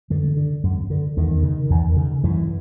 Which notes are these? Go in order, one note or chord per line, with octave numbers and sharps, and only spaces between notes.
F#2 D3
D3
F#2
D3
E2 D#3
C#3
E2
C#3
F#2 E3